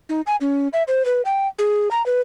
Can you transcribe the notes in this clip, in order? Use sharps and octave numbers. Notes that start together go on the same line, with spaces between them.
D#4
G#5
C#4
E5
C5
B4
G5
G#4
A#5
B4